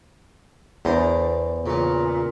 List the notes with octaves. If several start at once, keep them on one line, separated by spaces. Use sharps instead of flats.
E2 D4 A#4 C5
A#2 C#3 E3